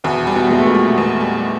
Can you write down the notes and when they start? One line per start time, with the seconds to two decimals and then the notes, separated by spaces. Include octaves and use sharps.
0.04 E2 B2 B3
0.27 G3
0.35 B2 B3
0.50 E2 G#3
0.59 A3
0.66 A#2 A#3
0.75 G3
0.98 E2
1.21 G3